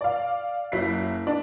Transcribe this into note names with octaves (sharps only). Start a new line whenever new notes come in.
D5 F5
F#1 F#3 E4 B6 C7
D4